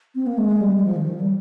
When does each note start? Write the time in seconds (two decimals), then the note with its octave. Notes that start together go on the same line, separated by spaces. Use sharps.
0.15 C4
0.27 A#3
0.38 G#3
0.61 G3
0.76 G3
0.84 F3
0.96 D#3
1.08 F3
1.20 G3